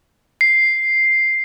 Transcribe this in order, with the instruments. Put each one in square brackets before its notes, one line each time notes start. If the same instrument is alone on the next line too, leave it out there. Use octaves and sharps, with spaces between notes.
[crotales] C7